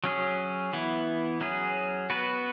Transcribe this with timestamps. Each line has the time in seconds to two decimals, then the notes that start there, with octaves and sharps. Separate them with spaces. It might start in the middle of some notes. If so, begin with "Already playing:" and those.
0.04 F#3 C#4 G#4
0.73 E3 B3 E4
1.41 F#3 C#4 G#4
2.10 B3 F#4 B4